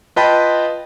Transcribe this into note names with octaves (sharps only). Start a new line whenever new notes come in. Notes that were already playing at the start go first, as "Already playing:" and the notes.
F4 B4 D#5 G5 A5 B5